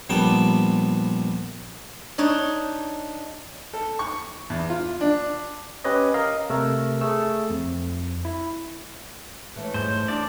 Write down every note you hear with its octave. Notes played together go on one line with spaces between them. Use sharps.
A#1 G3 B3 G5 A5
D4 D#4 C#5
A4
C#6
E2
F4
D4
C#4 G4 B4 C#5 D#5
A#4 D#5 F5
C3 A3 A#4 E6
A3 G#4 E6
F2
E4
E3 A3 C#4
G#2 C5
E2 D4 D5